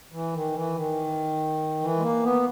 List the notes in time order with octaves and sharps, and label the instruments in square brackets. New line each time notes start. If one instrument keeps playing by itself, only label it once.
[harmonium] E3
D#3
E3
D#3
E3
G#3
A#3
B3